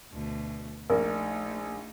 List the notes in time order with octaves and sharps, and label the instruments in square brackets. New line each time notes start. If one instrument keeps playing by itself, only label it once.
[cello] D2 B2
[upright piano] A#1 [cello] A3 D#4 [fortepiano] A#3